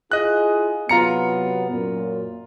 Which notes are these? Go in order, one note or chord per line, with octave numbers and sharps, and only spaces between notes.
E4 F4 G#4 D#5 F#6
C3 F#3 B3 F4 A#5 C#7
F#2 A#2